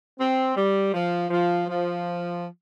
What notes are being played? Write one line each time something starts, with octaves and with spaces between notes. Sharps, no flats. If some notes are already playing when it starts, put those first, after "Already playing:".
C4
G3
F3
F3
F3